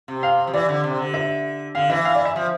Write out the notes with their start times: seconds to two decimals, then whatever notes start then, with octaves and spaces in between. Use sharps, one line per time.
0.08 C3
0.23 F5
0.47 F3
0.53 E3 D5
0.69 D3
0.84 C3
0.99 D3
1.14 E5
1.75 D3 F5
1.90 E3 E5
2.05 F5
2.15 D5
2.25 E5
2.36 F3